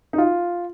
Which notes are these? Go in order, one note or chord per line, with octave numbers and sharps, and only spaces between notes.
D#4
F4